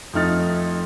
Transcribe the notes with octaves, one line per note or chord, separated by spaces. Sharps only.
F2 A3 D#4 F6 A6